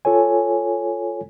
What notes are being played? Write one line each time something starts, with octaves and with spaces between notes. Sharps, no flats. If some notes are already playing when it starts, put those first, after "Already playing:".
F4 A4 C#5 G#5